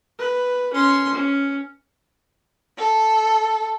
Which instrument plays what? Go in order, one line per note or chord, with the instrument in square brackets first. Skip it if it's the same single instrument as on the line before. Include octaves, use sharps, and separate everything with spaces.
[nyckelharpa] B4
C#4 C6
C#4
[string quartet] A4